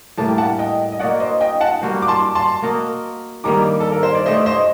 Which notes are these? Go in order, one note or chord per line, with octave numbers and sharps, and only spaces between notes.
A2 G3 A#3 D4 A5
G5
F#5 A5
D#5 G5
D#5
A#3 D4 F#4 D5 F#5
C5 D#5
D#5 G5
F#5 A5
G3 A#3 F#4 C5
D6
A5 C6
A5 C6
A#3 F#4 A#4 D#5
G2 D#3 G3 A#3 A#5 D6
A4
A#4
C5
D5
A3 D4 G4 C5 D#5
C5 D#5